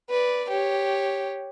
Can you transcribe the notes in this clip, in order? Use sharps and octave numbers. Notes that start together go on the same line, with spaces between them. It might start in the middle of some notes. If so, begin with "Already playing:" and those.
B4 D5
G4 C#5